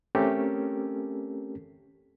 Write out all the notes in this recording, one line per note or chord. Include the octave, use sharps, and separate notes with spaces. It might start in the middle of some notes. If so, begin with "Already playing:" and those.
A3 C4 C#4 G4 A4 A#4